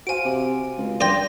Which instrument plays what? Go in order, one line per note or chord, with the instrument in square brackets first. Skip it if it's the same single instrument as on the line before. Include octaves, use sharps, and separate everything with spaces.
[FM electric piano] F#4 C5 F5 [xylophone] G#5 D7
[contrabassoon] C3
C#2
[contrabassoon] G2 [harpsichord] D5 G5 [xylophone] C6 A#6